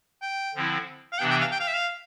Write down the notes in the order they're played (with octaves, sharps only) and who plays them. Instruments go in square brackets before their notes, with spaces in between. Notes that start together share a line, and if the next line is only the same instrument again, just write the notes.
[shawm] G5
[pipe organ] D3 F3 C4 E4
[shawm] F5
[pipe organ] C3 E3 B3 D4 [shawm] G5
[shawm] G5
F5
G5
F5
E5
F5